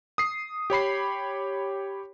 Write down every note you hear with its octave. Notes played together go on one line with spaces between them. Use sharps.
D#6 C7
G4 C#5 B5 C7